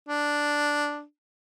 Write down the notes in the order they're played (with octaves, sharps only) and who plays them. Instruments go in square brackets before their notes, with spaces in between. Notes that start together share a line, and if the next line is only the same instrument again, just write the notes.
[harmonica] D4